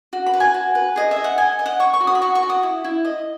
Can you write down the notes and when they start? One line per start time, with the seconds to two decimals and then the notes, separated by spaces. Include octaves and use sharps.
0.13 F#4
0.26 B5
0.33 B4
0.40 G#5
0.54 F#4
0.75 B4
0.96 G#4 D#5
1.11 E5
1.16 D#5
1.24 F#5
1.38 D#5 G#5
1.59 D#5
1.66 F#5
1.80 C#5 C#6
1.93 C#6
2.01 F#4
2.07 D#6
2.15 B5
2.22 F#4 C#6
2.35 C#6
2.43 F#4
2.50 D#6
2.63 E4
2.84 E4
3.05 D#5